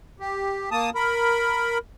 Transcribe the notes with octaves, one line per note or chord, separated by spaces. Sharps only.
G4
A#3 A5 D#6
A#4 B5